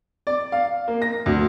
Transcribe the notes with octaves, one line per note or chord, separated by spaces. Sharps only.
D5
F5
A#3
A#6
D2